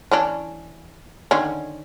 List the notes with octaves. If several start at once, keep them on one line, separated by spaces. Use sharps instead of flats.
E3 C#4 D4
D3 D#3 C#4